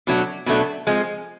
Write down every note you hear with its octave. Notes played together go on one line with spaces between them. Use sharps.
B2 F#3 A3 D4
B2 F#3 A3 D4
F3 G#3 C4